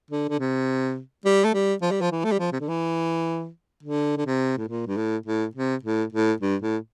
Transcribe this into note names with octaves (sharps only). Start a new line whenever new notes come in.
D3
D3
C3
G3
A3
G3
F3
G3
F3
E3
A3
G3
F3
C3
D3
E3
D3
D3
C3
A2
A#2
G2
A2
A2
C3
A2
A2
G2
A2